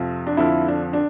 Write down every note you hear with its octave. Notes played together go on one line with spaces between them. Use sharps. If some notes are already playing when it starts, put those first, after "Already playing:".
Already playing: F2 C3 F3
D4
F2 D3 F3 E4
D4
D4